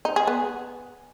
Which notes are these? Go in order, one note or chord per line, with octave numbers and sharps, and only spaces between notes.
D#4
G#4
B3